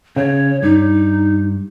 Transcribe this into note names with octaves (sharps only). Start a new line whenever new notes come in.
C#3 C#5
G2 D#4